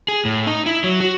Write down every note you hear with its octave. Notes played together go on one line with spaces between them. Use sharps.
G#4
A2
D#4
E4
F#3
F#4